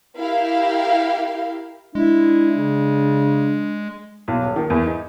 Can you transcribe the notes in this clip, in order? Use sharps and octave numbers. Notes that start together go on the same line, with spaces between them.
E4 G4 A#4 F5
G#3 D4 E4
C#3
B1
D#1
D#3
E2
D#4